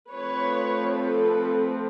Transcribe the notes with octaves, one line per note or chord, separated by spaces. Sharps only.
F3 A3 C4 B4 C#5
A4 B4